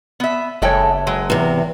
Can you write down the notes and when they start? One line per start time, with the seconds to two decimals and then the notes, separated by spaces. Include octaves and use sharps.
0.20 B3 E5
0.62 F#1 G#3 A4 C#5 E5 G5
1.07 F#3 G#3
1.30 E2 C3